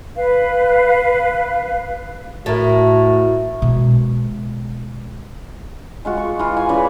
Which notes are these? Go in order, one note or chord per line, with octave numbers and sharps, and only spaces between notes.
B4 F5
A2 F#4 A#4 E5 A5
B2 G#3
G#3 F4 F#4
C#6
E3 F4
G#5
C#3 E3 B4 D5